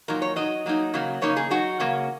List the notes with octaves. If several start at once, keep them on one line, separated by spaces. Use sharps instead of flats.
A#2 F#3 D#4 A#4
C#5
F#3 D#4 D#5
F#3 A#3 D#4
C#3 F#3 A#3
C#3 A#3 D#4 C#5
G#4
F#3 D#4 F#4
C#3 A#3 C#4